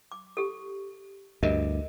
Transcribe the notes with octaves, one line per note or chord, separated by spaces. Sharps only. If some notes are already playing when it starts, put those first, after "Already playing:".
D6
G4 A4
D2 G2 A#4 D#5 E5